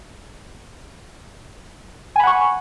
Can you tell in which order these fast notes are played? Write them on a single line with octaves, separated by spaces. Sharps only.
G#5 B5 F#5 C#6